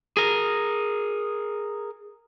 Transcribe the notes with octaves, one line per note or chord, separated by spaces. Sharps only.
G#4 A#4